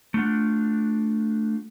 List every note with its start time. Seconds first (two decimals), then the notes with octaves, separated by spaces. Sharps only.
0.14 A3 D4 F4 F#5